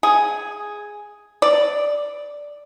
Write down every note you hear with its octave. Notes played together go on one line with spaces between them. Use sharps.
G#4
D5